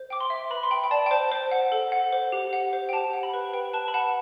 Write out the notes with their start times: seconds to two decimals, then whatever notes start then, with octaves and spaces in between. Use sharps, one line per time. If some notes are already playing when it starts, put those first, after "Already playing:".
Already playing: C5
0.10 G5 D6
0.20 C6
0.30 E5
0.50 B4 B5
0.63 C6
0.71 G5 B5
0.84 G5
0.91 D5 A5
1.06 G5
1.11 C5 A5
1.32 C5
1.51 F#5
1.72 A4
1.92 F#5
2.13 C5
2.32 G4
2.53 F#5
2.73 C5
2.89 G5
2.93 G4 A5
3.13 F#5
3.23 B5
3.34 B4
3.53 B4 G5
3.74 B4 A5
3.88 B5
3.94 F#5 A5